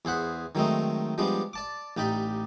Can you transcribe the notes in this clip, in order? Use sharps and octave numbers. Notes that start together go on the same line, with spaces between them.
E2 G#4 C5 F#5 B5
D#3 F#3 G#3 A3 C4 D#4
F3 G3 G#3 B3 D4
D5 A5 D6
A1 D#4 G4 D5 B5